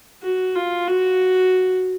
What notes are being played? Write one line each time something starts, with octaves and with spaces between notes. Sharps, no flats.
F#4
F4
F#4